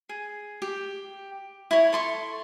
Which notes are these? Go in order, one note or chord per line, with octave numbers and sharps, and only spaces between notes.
G#4
G4
E4 C#5
A4 C6 C#6